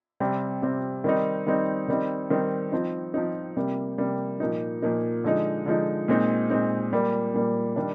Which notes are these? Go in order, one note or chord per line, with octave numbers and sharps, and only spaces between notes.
C3 G3 C4
C3 G3 C4
D#3 G3 C4 D#4
D#3 G3 C4 D#4
D#3 G3 C4 D#4
D#3 G3 C4 D#4
F3 C4 D#4
F3 C4 D#4
C3 G3 A#3
C3 G3 A#3
A#2 F3 A#3 D#4
A#2 F3 A#3 D#4
D3 F3 G#3 D#4
D3 F3 G#3 D#4
A#2 G#3 C4 D#4
A#2 G#3 C4 D#4
A#2 G3 A#3
A#2 G3 A#3
D#3 G3 D4